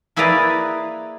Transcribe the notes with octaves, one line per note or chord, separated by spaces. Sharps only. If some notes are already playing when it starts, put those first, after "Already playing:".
A#3 E4 G#4 B4 D5 A#5